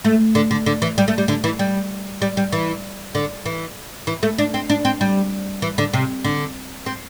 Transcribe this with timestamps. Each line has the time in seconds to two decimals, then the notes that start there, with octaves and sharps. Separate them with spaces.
0.04 A3
0.35 D3
0.51 D3
0.66 D3
0.82 E3
0.98 G3
1.08 A3
1.18 G3
1.28 D3
1.44 E3
1.59 G3
2.22 G3
2.37 G3
2.52 E3
3.15 D3
3.46 E3
4.07 E3
4.23 A3
4.38 D4
4.54 C4
4.70 D4
4.85 C4
5.01 G3
5.62 E3
5.78 D3
5.93 C3
6.24 D3
6.86 C4